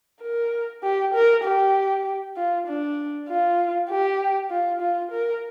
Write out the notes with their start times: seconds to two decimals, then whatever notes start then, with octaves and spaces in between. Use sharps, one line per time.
0.22 A#4
0.83 G4
1.14 A#4
1.44 G4
2.36 F4
2.67 D4
3.28 F4
3.89 G4
4.50 F4
4.81 F4
5.11 A#4